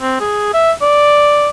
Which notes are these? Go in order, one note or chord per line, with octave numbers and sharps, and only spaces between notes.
C4
G#4
E5
D5